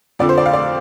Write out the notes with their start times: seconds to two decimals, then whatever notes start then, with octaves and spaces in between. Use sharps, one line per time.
0.19 F2 D3 F3 D5
0.29 C5
0.38 D5
0.46 F5
0.54 D5